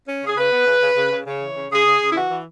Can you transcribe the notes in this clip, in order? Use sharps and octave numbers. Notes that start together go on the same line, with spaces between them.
C#4
C#3 G#4
C#3 B4
B3
C#3
C#3
C#3
C#3
C#3 C#5
E3
C#3
C#3 G#4
C#3
C#3
E4
E3 F#4
E3